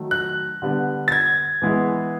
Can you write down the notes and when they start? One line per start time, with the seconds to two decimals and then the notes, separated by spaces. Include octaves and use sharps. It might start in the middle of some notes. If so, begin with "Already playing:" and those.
Already playing: D#3 F#3 A3
0.11 F#6
0.62 D3 G3 B3
1.08 A6
1.12 G#6
1.62 E3 G#3 B3 E4 G#4